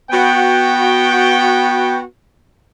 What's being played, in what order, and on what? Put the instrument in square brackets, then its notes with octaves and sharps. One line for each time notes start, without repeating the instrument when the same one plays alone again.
[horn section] B3 F#4 G5